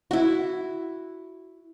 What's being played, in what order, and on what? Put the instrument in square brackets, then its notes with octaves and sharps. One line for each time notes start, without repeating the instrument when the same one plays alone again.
[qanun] E4 F#4